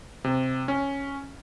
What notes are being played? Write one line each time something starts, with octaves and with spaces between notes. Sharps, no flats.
C3
C#4